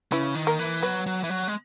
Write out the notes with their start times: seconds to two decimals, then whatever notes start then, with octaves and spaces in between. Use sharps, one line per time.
0.12 C#3 E3 E4
0.35 D#3
0.47 A#3 A#4
0.59 E3
0.82 F#3 B3 B4
1.06 F#3
1.24 E3
1.30 F#3
1.48 G#3